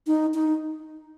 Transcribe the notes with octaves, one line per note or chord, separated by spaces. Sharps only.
D#4
D#4